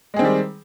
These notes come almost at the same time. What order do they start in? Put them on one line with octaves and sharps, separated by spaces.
G#3 G#4 C4 D#3 G3